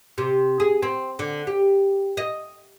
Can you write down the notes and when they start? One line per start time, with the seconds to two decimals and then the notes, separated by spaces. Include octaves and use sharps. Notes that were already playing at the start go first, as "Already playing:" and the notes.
0.18 C3
0.60 G#4
0.82 C4
1.19 D3
1.47 G4
2.17 D#5